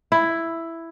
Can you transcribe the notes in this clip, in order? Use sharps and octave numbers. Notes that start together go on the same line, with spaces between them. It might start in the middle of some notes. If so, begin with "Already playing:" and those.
E4